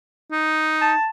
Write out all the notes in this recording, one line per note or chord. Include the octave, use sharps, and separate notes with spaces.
D#4
A5